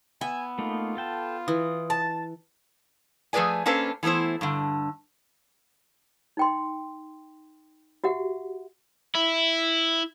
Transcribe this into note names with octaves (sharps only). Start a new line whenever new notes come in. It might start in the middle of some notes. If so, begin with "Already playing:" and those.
B3 E5 G#5
A3 A#3 D#4 F4
A4 G5 A5
E3 D#6
A5
F3 A3 G#4 B4 D5 G#5
A#3 C#4 D4 A4 B4 C5
E3 A3 B3 E4 C5
G2 D3
D#4 G5 C6
F#4 G4 E5 F#5
E4